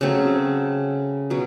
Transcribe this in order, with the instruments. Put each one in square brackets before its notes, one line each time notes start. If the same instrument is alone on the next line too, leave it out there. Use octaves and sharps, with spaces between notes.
[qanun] C#3 F#3 A3 C4
B2 F#3